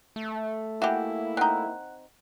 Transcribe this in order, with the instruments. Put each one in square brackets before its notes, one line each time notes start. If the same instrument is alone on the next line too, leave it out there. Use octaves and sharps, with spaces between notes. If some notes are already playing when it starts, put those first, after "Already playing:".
[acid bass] A3
[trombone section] A#3 E4 [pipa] F#4 G4 [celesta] E5 F#5 G#5
[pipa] C4 D#4 [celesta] F#5 F#6